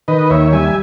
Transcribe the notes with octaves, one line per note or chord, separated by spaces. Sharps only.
D#3 B4 D#5
D#2 C#5 E5
G3 E5 G#5